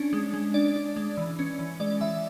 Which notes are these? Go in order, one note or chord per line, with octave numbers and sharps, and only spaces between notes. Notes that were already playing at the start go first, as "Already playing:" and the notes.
Already playing: C#4 D4
G#3
G#3
D4 D5
D4
G#3
E3
C#4
E3
G#3 D5
E3 E5